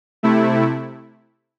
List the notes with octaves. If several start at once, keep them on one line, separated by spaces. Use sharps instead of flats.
C3 A3 E4